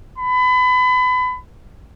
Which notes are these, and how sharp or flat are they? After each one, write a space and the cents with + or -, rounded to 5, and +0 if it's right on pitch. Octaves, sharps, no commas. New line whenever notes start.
B5 +30